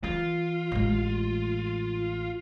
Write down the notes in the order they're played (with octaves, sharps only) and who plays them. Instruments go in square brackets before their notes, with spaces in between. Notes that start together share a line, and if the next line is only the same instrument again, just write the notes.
[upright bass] E3 [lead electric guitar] F4
[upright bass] A1 G#3